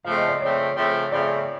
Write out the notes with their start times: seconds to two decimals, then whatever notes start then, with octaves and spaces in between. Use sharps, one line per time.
0.05 C#3 F3 A3 C4 F5
0.17 D#5
0.28 D5
0.41 C#3 F3 A3 C4 C#5
0.76 C#3 F3 A3 C4 C#5
1.12 C#3 F3 A3 C4 D5